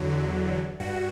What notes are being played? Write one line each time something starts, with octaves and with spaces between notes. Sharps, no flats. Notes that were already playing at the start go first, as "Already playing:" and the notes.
Already playing: E2 D3 F#3
G2 F#4